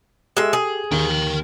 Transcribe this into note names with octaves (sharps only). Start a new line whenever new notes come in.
G#3 G4 A4 E5
G#4
D#2 A#4 G5